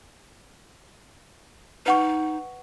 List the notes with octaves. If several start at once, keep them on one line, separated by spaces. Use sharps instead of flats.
D#4 B4 F#5 C#6